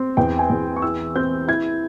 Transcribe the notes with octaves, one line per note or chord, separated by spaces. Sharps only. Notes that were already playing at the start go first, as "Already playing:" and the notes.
Already playing: C4
E2 G5
G#5
E2
C#6
E4 E6
C4 G6
E4 G#6